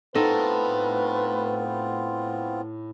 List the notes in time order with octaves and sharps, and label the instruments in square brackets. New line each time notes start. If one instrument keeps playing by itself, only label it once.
[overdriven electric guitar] A2 [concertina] B3 C4 F4 [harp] D#4 A4 [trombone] B4